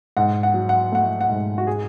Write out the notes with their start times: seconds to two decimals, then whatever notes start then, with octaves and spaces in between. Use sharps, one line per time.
0.17 G#2 F#5
0.43 F#5
0.54 F#3
0.69 F#5
0.92 A3 F#5
1.21 F#5
1.29 G#2
1.58 F#4
1.67 G#4